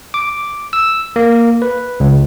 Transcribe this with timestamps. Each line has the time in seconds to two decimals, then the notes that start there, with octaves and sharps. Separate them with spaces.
0.14 D6
0.73 E6
1.16 A#3
1.62 B4
2.00 C#2